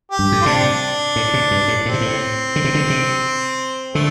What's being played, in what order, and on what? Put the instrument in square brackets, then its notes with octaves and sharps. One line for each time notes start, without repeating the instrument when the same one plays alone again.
[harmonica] G4
[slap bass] G2
A2
[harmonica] F4
[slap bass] C3 [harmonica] D4
[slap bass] A2
C3
G2
A2
[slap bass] A2 [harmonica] C4
[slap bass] C3
A2
D3
C3
D3
C3
[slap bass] D3 [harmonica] A3